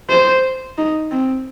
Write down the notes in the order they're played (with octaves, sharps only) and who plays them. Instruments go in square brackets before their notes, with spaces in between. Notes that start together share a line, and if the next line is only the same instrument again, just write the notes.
[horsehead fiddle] C5
D#4
C4